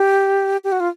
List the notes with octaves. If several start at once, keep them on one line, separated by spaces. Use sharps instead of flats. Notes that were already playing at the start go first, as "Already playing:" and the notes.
Already playing: G4
G4
F#4
F4